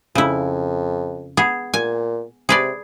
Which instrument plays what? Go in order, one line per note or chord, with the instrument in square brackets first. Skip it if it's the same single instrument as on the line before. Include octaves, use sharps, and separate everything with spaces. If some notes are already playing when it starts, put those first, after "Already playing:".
[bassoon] F2 [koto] C#3 E4
[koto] B3 G#4
[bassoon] A#2 [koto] G#5
[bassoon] C3 [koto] G#4 B4 D5